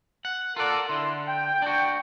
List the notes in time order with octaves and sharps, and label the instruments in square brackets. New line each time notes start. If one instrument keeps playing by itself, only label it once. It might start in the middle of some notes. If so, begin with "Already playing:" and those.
[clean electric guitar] F#5
[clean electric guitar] F4 D5 [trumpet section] A4 A#4 F#5
[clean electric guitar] D3 [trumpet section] E4 C6
[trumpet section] G5
[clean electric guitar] D4 F#4